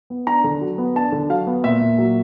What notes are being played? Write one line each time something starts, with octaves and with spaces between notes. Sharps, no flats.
B3
D4 A#5
D3
F#3
B3
D4 A5
D3
F#3 F5
B3
A#2 E5
A#2
F#3